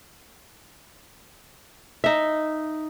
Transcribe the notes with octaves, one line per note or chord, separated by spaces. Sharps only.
D#4 E5